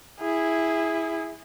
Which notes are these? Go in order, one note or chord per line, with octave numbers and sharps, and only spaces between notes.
E4 G#4